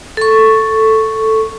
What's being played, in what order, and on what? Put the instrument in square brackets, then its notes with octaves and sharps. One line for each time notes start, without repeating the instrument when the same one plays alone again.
[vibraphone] A4 C#6